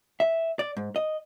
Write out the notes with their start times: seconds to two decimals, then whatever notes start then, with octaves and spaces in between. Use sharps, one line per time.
0.20 E5
0.59 D5
0.77 G#2
0.96 D#5